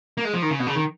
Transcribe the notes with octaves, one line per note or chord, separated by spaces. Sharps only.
A#3
G#3
F3
D#3
C#3
B2
C#3
D#3